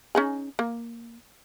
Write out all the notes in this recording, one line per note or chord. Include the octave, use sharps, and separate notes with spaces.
C#4 D#4 G#4
A#3